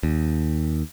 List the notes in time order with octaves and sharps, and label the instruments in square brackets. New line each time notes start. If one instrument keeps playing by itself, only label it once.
[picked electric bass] D#2